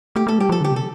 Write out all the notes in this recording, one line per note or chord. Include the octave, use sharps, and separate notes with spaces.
A3 G4
A3 A4
G3 G4
F3 A4
D3 G4
C3 A4